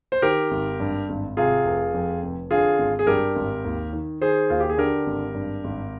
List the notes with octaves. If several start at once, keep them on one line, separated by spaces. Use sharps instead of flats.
C5
D#3 G4 A#4
G#1
G2
G#1
C3 F4 G#4
F1
F2
F1
D3 F4 G#4
G#1
G#4
G2 G4 A#4
G#1
D#2
D#3
D#3 G#4 C5
D#2 F4
G4
G#4
D3 G4 A#4
G#1
G2
G#1